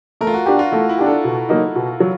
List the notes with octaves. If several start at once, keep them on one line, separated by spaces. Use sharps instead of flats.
A3 A#4
F4
F#4
D4 F#4 G4
F4
A3 E4
E4
D4 G4
A4
B2
F#3 A#3 D#4
B2
F#3